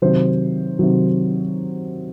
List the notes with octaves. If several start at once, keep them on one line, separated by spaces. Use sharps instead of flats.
C3 D#3 F#3 C5
C3 D#3 F#3